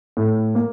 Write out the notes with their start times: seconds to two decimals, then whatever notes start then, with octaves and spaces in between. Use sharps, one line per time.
0.17 A2
0.55 A#3